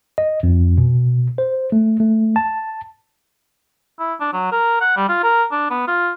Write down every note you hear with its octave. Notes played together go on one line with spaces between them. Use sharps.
D#5
F2
B2
C5
A3
A3
A5
E4
D4
F#3
A#4
F#5
G3
F4
A#4
D4
B3
F4